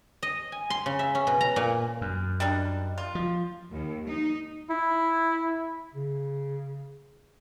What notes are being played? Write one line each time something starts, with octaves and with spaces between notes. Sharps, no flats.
D#5
G#5
C6
C#3
E5
C#4
B2
A#5
A#2
F#2
G3 D4 D#4
F4
F3
D#2
D#4
E4
C#3